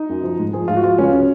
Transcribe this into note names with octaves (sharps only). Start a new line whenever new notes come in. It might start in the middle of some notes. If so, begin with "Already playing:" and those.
Already playing: D#4
F#2
F3
G#2
F3 G#4
G#2 F4
F#4
F3 F4
C#2 C#4
C#3 F#3